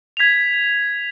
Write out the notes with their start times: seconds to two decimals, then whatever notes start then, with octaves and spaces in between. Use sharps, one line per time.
0.17 G#6 B6 F7